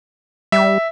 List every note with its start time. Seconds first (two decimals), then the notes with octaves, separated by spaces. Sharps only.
0.52 G3 E5